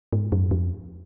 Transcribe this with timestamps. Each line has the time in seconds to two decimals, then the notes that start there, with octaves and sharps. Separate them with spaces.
0.13 G#2
0.32 F#2
0.51 F2